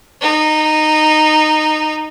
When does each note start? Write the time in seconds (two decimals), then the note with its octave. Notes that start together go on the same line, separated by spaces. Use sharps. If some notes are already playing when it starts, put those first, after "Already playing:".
0.21 D#4